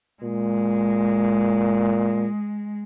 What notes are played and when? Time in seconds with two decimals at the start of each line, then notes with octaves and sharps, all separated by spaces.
0.23 A#2 G#3